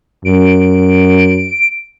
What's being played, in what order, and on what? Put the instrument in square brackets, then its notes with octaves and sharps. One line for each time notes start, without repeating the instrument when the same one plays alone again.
[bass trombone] F#2 [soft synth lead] D7